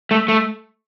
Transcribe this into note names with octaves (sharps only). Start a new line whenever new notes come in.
A3
A3